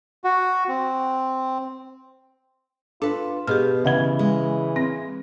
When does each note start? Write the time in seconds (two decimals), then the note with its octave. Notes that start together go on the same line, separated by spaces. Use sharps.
0.24 F#4
0.68 C4
3.02 D4 F4 A4 B4
3.47 B2 G4 G#4 F6
3.85 C#3 E3 D#5 F#5 G#6 G7
4.19 G#3
4.76 C4 A#6